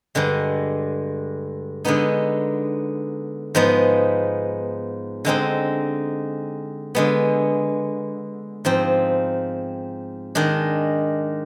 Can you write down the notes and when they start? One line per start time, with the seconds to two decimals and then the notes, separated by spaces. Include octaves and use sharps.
0.15 G2 D3 G#3
1.85 D3 G#3 B3 D#4
3.55 G#2 F3 G#3 B3
5.25 D3 G#3 C4 D#4
6.95 D3 G#3 B3
8.65 G#2 F3 C4
10.35 D#3 G#3 D4